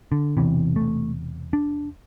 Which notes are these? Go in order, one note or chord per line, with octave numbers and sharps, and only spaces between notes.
D3
E1 E2 C3 E3
A3
D4